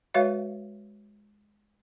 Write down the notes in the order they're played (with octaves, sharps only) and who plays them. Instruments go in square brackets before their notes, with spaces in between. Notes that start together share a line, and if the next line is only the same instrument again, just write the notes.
[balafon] G#3 F#4 B4 C#5 E5 F5